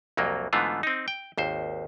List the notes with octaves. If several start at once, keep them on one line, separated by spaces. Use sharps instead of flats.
C2 F2 F#3 A#3
G#2 D3 E3 A3 B3 F4
C4 D#4
G5
G#1 D#2 C5